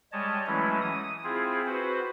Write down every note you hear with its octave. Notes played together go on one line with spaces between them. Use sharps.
G3 G#3 C#5 D#5 A5
E3 F#3 G#3 A3 C#4 E4
D#6
C4 E4 F4 G#4
F#4 B4 C5